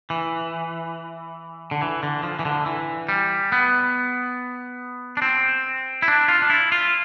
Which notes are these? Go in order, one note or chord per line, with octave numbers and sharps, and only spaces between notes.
E3
D3
E3
D3
F3
E3
D3
E3
G3
B3
D4
C4
E4
D4
F4
D4
E4
F4